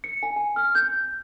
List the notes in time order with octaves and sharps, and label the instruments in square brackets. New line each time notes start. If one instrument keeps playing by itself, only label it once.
[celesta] C#7
G#5
G#5
F6
G6